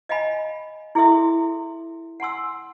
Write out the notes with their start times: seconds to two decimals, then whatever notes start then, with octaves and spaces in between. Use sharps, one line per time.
0.09 D#5 F5 G5 G#5 B5
0.95 E4 G#4 A4 E5 C6 D#6
2.20 F#5 G#5 C6 E6